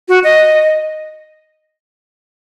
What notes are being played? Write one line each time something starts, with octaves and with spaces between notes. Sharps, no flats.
F#4
D#5